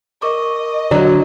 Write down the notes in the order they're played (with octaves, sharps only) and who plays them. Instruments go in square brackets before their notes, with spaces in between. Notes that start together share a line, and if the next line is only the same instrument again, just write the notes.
[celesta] A#4 C#6 D6 [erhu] D#5
[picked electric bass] D3 [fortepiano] F#3 [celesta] A#5